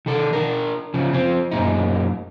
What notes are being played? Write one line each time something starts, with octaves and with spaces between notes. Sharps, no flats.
D#3 A4
D4 A#4
C#3 F3
F3 C4
F#2 A#2 D#4